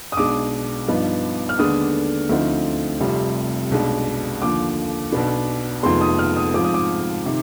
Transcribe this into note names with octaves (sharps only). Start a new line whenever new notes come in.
D#6
B1 B2 G#3 D4 D6
G2 F3 B3 D#4
F6
D#2 D3 G#3 B3 D4 D#6
D2 D3 F3 C4 D#4
F1 F2 C3 G3
B1 B2 G#3 D4
D#2 D3 F3 D6
B1 B2 B3 D4
F1 F2 D#3 G#3 B3 C6
D#6
F6
D#6
G#2 F3 C4 D6
D#6
D6
C3 D#3